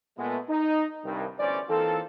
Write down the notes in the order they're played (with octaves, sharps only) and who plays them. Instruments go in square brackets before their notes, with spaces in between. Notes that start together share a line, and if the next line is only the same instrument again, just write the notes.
[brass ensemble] A#2 G#3 A3 B3
D#4
C2 G2 D#3
G1 D2 E3 C#4 C5 D5
E3 A#3 C4 D#4 F4 A4